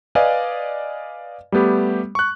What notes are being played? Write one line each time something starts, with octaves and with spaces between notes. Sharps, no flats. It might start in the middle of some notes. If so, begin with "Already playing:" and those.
B4 D5 D#5 F5 G#5
G3 A3 B3 G4
C#6 F#6